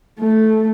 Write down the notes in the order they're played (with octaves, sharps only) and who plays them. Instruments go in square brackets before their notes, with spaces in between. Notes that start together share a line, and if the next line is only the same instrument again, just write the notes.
[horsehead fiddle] A3